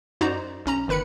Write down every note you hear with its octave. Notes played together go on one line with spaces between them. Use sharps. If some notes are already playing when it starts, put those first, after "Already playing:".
F#2 D#4 F#4 C5 D5 A#5
B1 C#4 A#5
G1 D#3 B4 B5 C#7